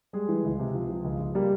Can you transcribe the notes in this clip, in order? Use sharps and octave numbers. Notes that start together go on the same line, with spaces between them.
G3 G#3 G#4
E3
C#2
C3
F3
F3
C#2
C#2
G3 A#3 G4